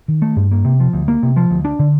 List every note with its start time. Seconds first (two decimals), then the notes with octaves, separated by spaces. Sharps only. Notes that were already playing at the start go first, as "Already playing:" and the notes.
0.08 D#3
0.22 A3
0.36 G2
0.52 A#3
0.65 C3
0.80 F3
0.93 D2
1.08 A#3
1.23 C3
1.37 F3
1.50 D2
1.65 D4
1.79 D3